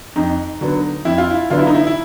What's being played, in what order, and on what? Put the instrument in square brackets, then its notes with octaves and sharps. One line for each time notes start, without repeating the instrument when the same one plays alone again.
[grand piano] F2 D#4
D3 F#3 B3
F2 E4
F4
E4
D3 F#3 B3 F4
E4
D#4
E4
E4